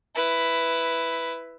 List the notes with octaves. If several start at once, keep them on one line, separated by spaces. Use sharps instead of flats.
E4 B4